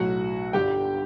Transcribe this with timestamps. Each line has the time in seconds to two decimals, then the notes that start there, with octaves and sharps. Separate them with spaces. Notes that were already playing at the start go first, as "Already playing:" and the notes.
Already playing: B1 A2 F#3 F#4 F#5
0.53 G1 G2 D3 G4 G5